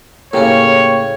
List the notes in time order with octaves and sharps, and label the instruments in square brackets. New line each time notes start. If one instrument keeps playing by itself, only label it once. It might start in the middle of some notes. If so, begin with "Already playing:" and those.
[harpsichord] A2 C#3 C#4 [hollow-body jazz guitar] A#3 G4 [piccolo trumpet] C#5